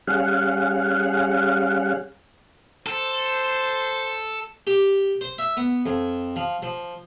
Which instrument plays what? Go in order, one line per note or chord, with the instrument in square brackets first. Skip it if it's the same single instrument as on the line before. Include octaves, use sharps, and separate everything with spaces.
[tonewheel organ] G3 C#4 G#4 F5 F#5
[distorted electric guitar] A4 [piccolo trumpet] C5
[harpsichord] G4
C5
E5
B3
F2
F3
F3